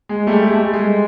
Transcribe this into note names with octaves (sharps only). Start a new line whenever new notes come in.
G#3
G3 A3
G#3
G3 A3
G#3